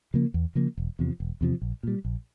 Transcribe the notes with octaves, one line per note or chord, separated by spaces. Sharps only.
C#3 F3 A#3
E2
C#3 F3 A#3
E1
E2 C3 F3
E1
E2 C3 F3
A#1
A#2 G3
A#1